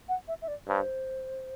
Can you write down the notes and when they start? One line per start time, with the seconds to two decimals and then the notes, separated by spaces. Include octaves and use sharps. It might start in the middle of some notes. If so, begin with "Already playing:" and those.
0.09 F#5
0.28 E5
0.42 E5
0.48 D5
0.68 G2 C5